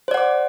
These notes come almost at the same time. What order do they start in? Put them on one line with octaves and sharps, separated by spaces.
C5 D5 F#5 D6